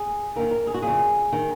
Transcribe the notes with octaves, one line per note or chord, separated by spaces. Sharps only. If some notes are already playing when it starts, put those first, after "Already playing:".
Already playing: G#4
D#2 D#3 A#4
A#4
G#4
F#4
F2 C#3 G#4
D#3